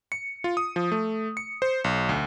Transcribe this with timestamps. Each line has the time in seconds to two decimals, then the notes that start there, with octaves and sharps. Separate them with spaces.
0.12 C#7
0.44 F4
0.57 D#6
0.76 F3
0.92 A3
1.37 C#7
1.62 C5
1.84 B1
2.09 D2